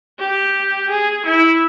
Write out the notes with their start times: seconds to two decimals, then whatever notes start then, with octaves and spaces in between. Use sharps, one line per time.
0.19 G4
0.90 G#4
1.26 E4